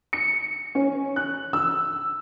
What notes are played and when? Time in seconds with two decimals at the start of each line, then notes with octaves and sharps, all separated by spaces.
0.13 C#7
0.75 C#4
1.16 F#6
1.53 E6